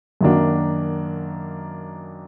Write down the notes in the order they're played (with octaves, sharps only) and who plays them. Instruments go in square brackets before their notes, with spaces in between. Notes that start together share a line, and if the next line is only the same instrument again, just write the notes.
[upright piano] F#2 D#3 A#3 D4 F#4